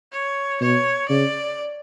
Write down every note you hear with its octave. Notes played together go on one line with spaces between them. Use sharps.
C#5
B2 C#5
C#3 D5